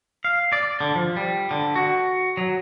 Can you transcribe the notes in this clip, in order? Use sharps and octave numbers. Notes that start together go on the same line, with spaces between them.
F5
D5
D3
F3
G3
D3
F#4
F#3